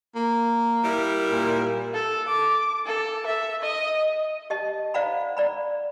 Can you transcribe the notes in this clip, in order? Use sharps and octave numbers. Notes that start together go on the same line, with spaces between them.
A#3
G3 E4 A#4
A#2
A4
D6
A4
E5
D#5
G4 D#5 A5
C5 D5 F5 F#5 A#5 B5
D5 A#5 B5